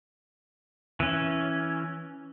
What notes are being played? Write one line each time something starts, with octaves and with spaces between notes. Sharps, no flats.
E3 C#4